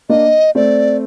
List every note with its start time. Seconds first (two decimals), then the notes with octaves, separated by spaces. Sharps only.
0.09 A#3 D4 D#5
0.55 A3 C4 D5